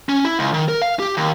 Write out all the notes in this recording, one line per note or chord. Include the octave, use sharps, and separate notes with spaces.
C#4
E4
C#2
D#3
A#4
F5
G4
D#2